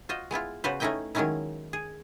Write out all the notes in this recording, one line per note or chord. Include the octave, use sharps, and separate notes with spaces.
F4 F#4 C5 D#5
G#3 B3 E4 F4
C#3 B3 F#4 B4 C5
A3 C#4 D#4 E4 D#5 G5
D#3 F#3 G#3 C#4 D#4 E4
G#4